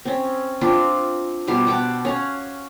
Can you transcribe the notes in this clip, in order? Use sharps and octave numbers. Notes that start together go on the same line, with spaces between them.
C4 C#4
C4 D4 F4 C6
B2 G3 G4 C6
F#5 G5 A5 D6
C#4 F5 F#5